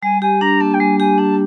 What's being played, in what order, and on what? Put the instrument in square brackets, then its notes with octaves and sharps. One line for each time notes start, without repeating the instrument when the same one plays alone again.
[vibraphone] G3 [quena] G#5
[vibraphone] G4 [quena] G#5
[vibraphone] D4 [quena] A#5
[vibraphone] A#3 [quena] A5
[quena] G5
[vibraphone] G3 [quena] G#5
[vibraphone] G4 [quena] G#5
[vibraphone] D4 [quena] A5